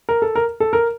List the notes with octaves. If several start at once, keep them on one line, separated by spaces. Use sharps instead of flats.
A#4
A4
A#4
A4
A#4